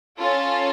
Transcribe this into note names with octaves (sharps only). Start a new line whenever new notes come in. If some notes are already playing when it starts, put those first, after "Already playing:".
C#4 F4 A4